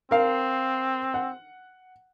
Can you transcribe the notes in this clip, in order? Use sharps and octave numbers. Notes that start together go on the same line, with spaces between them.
C4 A#4 F5
F#5